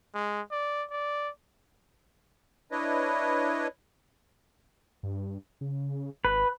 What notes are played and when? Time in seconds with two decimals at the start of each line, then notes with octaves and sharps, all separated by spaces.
0.14 G#3
0.51 D5
0.90 D5
2.72 D4 E4 B4 C#5 D#5
5.03 G2
5.61 C#3
6.25 G#1 B4